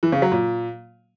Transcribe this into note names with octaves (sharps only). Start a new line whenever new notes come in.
E3
C#3
F#3
A#2